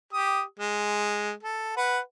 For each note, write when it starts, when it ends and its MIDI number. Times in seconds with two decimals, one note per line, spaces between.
0.13 0.42 67
0.13 0.42 87
0.59 1.32 56
1.43 1.75 69
1.77 1.99 71
1.77 1.99 78